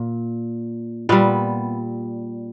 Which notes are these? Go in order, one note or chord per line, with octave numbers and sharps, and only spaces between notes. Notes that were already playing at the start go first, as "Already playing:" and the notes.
Already playing: A#2
A#2 G3 B3